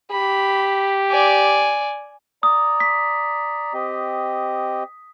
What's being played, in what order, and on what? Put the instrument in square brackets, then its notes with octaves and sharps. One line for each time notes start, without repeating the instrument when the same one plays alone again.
[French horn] G4 [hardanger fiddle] B5
[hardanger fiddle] D5 G#5
[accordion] D5 A#5 [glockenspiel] D#6
[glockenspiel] B6
[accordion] C4 G4 D#5